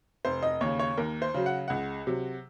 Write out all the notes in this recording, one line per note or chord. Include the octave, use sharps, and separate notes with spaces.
F1 C5
D#5
D#2 C#3 C#5
C#5
D#2 A#4
C5
C#3 F#3
F#5
C#2 F#5
C3 F#3